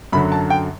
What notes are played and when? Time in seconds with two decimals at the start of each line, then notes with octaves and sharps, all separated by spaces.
0.12 F#2 D3 F#3 B5
0.32 A5
0.50 G5